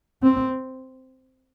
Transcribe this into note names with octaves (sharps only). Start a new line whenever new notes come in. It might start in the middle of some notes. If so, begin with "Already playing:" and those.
C4